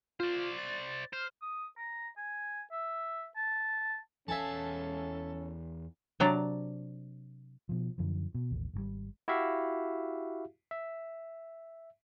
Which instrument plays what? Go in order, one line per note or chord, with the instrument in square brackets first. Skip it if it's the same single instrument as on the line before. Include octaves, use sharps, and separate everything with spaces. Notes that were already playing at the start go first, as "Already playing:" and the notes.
[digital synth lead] F4 [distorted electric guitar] C5 D5
[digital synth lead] A6
[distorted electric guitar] C5 [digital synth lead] F6
[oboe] D#6
A#5
G#5
E5
A5
[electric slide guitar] E2 F5 [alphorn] C#4 [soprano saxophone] A4 [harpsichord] E5 G#5 A5
[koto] C3 F#3 D4 D5 A#5
[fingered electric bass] B2 F3
F#2 D3 E3 F3
B2
A1 D#2
G#1 C#3 G3
[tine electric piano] E4 F#4 G4 E5 F5
E5